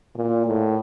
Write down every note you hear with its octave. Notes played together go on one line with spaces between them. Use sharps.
A#2
A2